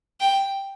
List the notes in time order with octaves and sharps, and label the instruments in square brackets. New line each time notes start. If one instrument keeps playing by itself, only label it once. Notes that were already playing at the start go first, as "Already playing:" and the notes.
[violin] G5